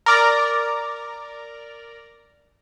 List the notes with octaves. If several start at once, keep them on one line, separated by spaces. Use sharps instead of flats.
A#4 D5 A#5